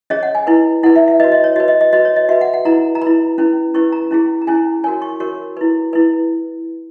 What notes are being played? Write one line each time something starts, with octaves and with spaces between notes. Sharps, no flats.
C#4 G#4 C#5 D#5
F#5
G#5
E4 B4
E4 B4 F#5
E5
E5
F#4 B4 D#5
D#5
C#5
F#4 B4 D#5
D#5
D#5
F#4 B4 D#5
C#5
D#5
F#4 B4 E5
F#5
F#5
E4 B4 A#5
A#5
E4 B4 B5
C#4 E4 B4
C#4 E4 B4 C#6
A#5
C#4 E4 G#4
A#5
C#4 E4 G#4 G#5
F#4 A#4 C#5 G#5
C#6
F#4 A#4 C#5 C#6
E4 B4
E4 B4